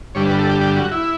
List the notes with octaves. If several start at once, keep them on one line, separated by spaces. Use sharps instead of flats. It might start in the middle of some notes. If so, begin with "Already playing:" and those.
G2 D3 G3 C#5
B4
A4
G4
G4
F#4
E4